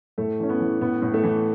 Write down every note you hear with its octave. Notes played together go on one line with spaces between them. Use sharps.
A2 A3
E3 C#4
B3
E3
A2 B3
A2
A3
E3